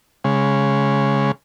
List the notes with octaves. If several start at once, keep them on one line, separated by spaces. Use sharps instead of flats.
C#3 G#3